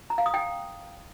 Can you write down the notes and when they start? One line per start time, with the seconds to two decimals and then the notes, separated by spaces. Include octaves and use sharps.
0.10 A#5
0.18 F5
0.26 D#6
0.34 G5